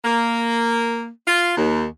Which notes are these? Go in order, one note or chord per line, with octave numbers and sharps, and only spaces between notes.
A#3
F4
D#2